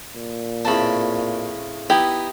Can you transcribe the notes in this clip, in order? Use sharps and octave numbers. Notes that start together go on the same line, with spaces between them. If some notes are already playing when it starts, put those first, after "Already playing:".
A#2
A2 C#3 C4 A5 B5
B3 D#4 E4 G4